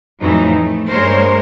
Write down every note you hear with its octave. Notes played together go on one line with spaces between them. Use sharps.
F2 A2 E3 F#3 D#4
A3
G2 G#3 A#3 A#4 C5 C#5